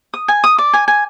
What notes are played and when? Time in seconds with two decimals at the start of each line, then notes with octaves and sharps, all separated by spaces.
0.14 D#6
0.28 G#5
0.44 D#6
0.58 D5
0.73 G#5
0.88 G#5